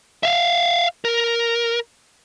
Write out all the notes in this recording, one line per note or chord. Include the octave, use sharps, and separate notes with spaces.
E5 F5
A#4